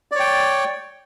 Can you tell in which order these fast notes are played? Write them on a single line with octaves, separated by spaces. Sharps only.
D5 C#5 G5